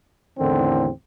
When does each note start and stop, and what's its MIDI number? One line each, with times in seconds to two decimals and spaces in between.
0.38 0.89 40
0.38 0.89 45
0.38 0.89 50
0.38 0.89 51
0.38 0.89 60